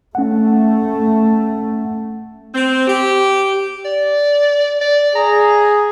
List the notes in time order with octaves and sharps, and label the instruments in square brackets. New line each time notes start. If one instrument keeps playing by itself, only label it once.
[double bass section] A3 [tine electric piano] C#4 F#5
[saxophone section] C4
G4
[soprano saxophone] D5
D5
[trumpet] G#4 [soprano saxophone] A#5